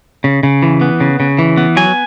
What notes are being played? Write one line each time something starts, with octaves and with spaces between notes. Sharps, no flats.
C#3
C#3
E3
B3
C#3
C#3
E3
B3
F#3 G#5